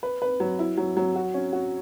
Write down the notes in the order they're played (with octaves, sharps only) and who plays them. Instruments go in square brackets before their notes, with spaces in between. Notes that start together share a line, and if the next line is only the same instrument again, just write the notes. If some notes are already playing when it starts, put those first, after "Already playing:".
[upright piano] B4
B4
F#3
E4
F#3
F#3
F#4
C#4
F#4